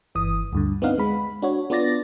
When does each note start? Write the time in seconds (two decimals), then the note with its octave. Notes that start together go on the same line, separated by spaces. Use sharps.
0.15 G1 E3 D#6
0.53 D2 G2 D3
0.82 B3 C4 D4 D#4 F5 F#5
0.98 G#3 B5
1.42 D4 F#4 C#5
1.70 B3 D4 F4 D5 A6 A#6